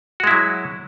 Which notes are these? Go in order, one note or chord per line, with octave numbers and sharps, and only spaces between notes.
F#3 G#3 E4 F#4